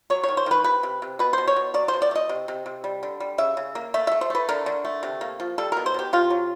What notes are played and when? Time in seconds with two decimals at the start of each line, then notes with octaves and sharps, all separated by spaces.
0.10 F#3 C#5
0.24 D#3 C#5
0.37 C5
0.46 D#3 B4
0.64 C3 B4
0.83 C3
1.02 C3
1.19 B2 B4
1.33 B2 C5
1.47 C#5
1.56 B2
1.74 F#3 D5
1.88 C5
1.93 B2
2.02 D5
2.11 A3
2.15 D#5
2.29 C3
2.48 C3
2.66 C3
2.84 G3
3.03 D3
3.20 G3
3.38 C#3 E5
3.57 C#3
3.75 A#3
3.94 A3 E5
4.07 A3 E5
4.21 C5
4.30 A3 B4
4.49 D3 A#4
4.66 D3
4.85 A3
5.03 C3
5.21 A#3
5.40 F3
5.58 G3 A4
5.72 B2 A#4
5.86 C5
5.94 B2 G4
6.13 C3 F4
6.30 F#3